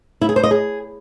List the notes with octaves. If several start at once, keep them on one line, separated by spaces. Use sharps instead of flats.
E4
G#4
C5
D#5
G#4